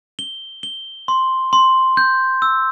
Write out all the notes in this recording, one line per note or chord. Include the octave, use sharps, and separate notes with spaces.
G7
G7
C6
C6
G6
E6